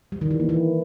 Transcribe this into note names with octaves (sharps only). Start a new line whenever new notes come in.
G3
D#3
E3
A#3
E3